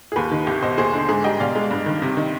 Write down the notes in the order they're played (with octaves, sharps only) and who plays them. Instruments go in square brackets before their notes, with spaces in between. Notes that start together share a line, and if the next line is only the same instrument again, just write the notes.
[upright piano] G#4
D#2 G4 B4
D#3
C2 G4
B2 C5 D#5
D#2 G#4 C5
D3
G#2 G#4
G3 D#5 G5
B2 D5 F5
G#3
G2
D#3
C3
D#3